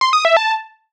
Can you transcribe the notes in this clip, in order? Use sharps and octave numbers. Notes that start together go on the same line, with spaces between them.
C6
D#6
E5
A5